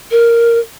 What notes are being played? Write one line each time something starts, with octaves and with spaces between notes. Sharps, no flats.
A#4